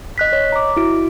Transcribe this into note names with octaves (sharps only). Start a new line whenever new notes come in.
D#5 F#6 B6
C#5 D#5
A#5 D6
E4 F#4 D7